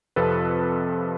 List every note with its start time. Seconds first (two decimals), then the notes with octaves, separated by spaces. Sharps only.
0.16 F2 C3 F3 A4 B4